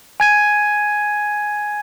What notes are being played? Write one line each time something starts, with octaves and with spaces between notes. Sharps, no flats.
G#5 G#6 D#7